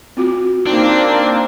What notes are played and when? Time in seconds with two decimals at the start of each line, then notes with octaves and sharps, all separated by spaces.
0.17 C4 F4 F#4
0.67 A#3 C4 D4 D#4